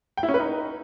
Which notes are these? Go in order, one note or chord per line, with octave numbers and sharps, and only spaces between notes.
G5
E4
C#4
B4
D#4